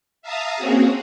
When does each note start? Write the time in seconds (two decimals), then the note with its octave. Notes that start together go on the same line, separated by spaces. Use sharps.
0.22 E5 F5 A5 A#5 D#6
0.56 A#3 C4 C#4 F#4 G#4